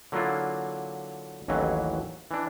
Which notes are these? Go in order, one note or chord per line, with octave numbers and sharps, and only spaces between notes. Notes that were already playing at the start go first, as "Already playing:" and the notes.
D3 F#3 A#3 E4 F4
A1 D#2 E3 F#3
E3 D4